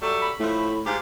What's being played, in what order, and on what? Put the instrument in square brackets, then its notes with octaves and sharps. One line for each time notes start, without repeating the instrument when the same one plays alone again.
[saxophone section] F#3 G3 A3
[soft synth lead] B5
[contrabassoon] A2 [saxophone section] F3 A3
[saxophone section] G#2 F4 G4